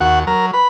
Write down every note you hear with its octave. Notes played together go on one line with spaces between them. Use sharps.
D#2 F#4 F#5
F#3 A#4 A#5
B4 B5